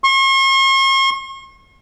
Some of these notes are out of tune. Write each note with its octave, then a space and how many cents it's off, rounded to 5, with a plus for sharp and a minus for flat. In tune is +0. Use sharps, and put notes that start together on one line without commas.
C#6 -45